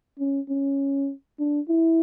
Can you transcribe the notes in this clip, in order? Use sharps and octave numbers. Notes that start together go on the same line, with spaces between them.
C#4
C#4
D4
E4